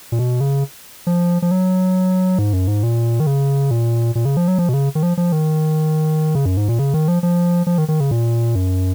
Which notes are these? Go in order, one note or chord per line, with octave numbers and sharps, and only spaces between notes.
A#2
B2
C#3
F3
F3
F#3
G#2
F#2
G#2
A#2
D#3
C#3
A#2
A#2
C#3
F3
F#3
F3
B2
C#3
D#3
F3
F3
D#3
C#3
F#2
G#2
A#2
C#3
D#3
F3
F3
F3
D#3
D#3
C#3
A#2
F#2